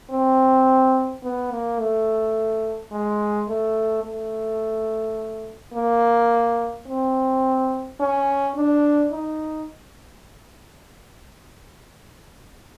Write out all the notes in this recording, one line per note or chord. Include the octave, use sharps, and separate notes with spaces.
C4
B3
A#3
A3
G#3
A3
A3
A#3
C4
C#4
D4
D#4